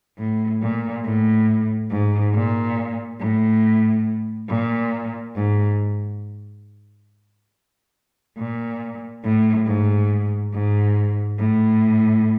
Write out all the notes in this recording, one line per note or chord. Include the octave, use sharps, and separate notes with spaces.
A2
A#2
A2
G#2
A#2
A2
A#2
G#2
A#2
A2
G#2
G#2
A2